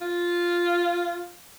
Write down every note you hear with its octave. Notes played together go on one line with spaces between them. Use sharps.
F4